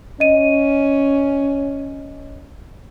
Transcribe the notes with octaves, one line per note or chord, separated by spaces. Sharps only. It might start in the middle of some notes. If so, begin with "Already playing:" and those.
C#4 D#5 D#7